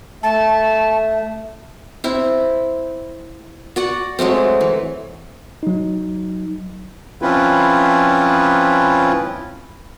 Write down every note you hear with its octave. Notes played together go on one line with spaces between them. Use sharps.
A3 A5
C4 E4
F#4 D5 F#5
F#3 G#3 A3 C4
E3
F#3 D#4
F3 C4 C#4 E4 F4 B4